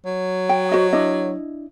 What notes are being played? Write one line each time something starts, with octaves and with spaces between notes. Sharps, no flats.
F#3
G5
F#4 C5 D#5
D4 E4 D#5